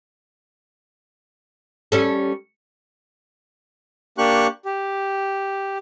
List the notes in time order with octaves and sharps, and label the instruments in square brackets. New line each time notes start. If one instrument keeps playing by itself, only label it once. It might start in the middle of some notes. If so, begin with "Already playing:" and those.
[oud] G3 C#4 A4
[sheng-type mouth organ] A#3 D4 G4 C#6 F#6
G4